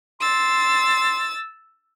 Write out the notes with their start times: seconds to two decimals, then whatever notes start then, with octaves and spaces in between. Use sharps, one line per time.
0.20 C6 E6 A6